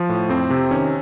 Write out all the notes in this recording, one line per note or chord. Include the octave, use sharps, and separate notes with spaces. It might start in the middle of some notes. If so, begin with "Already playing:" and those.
Already playing: F3
A2
F2 C4
C3
D#3 C#4